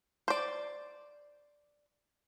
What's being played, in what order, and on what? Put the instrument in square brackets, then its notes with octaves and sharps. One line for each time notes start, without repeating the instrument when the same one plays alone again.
[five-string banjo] C5 D5